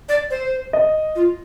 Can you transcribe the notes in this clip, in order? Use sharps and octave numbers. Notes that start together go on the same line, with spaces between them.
D5
C5
D#5
F4